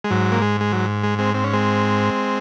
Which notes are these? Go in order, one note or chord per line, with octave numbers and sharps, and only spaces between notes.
G#3
G#2 F#3
A#3
G#3
G#3
F#3
G#3
G#3 C4
C4
C#4
G#3 C4